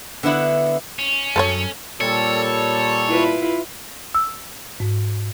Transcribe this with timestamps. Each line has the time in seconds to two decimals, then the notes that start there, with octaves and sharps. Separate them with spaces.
0.23 D3 B3 E4 F#5
0.99 C#4
1.36 F#2 A4 C5 C#5
2.01 A#2 G3 A4 C#5
3.06 E4 F4 B4
4.15 E6
4.80 G#2